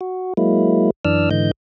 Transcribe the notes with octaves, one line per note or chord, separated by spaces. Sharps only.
F#4
F#3 G#3 A#3 E4
F#2 E3 D4 D5 E6 F6
G#2 D3 E3 D#5 G6